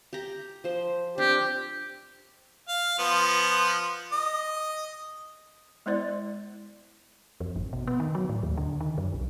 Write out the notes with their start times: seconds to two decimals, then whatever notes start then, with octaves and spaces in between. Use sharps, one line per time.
0.13 G4 A#5
0.64 F3 C5
1.18 C4 D4 G4
2.69 F5
2.99 F3 B3
4.12 D#5
5.86 G#3 B3 E4 C5 D5
7.40 F2
7.56 G#1
7.73 B2
7.87 B3
8.00 D#3
8.15 F#3
8.29 A2
8.43 D#2
8.57 D3
8.81 D#3
8.98 F#2
9.13 B1